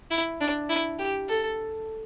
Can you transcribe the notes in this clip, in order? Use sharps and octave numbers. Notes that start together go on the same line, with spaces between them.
E4
D4
E4
G4
A4